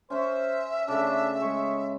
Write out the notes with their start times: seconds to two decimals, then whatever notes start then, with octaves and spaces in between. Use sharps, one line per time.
0.10 C#4 C5 E5
0.88 C#3 A3 D4
1.41 G#3 C#5